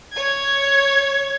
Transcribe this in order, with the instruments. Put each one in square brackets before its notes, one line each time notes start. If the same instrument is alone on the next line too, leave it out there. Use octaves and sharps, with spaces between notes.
[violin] C#5 G#6